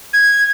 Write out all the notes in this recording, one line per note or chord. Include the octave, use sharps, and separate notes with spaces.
G#6